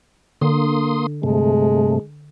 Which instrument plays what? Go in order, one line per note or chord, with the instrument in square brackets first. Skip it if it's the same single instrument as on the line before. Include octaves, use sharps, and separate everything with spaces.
[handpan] D3 [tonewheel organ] A#3 C6 D#6
[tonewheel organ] G2 C3 A3 [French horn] G#3